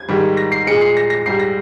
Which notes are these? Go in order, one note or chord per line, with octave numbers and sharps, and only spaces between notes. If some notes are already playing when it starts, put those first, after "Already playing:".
Already playing: G#6
G#2 D#3 G3
A#6
C7
A#2 G#3 C#7
C7
A#6
A#6
G#2 G3 C7
A#6